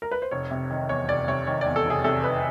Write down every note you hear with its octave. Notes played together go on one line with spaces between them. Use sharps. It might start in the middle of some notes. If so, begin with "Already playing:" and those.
A#4
B4
C5
F1 C#5
C3
D#3
E2 C#5
F1 D5
C3 C#5
D#3 C#5
D5
E2
A4
F1 G#4
C3 A4
D#3 B4